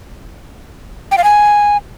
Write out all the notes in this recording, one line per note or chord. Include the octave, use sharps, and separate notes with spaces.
G5
F5
G#5